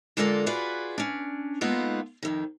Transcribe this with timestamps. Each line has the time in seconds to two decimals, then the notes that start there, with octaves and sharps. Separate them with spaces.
0.17 D3 G#3 F4 A4 A#4 D5
0.46 F4 F#4 G#4 B4 D5
0.98 C#4 D4
1.61 G#3 A#3 B3 D#4 F4 A4
2.23 F2 D#3